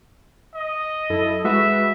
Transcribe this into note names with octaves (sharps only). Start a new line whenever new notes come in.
D#5
F#2 E4 A4
G#3 F#4 B4 E5